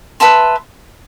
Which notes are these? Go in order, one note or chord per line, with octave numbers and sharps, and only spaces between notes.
B4 E5 A5 C6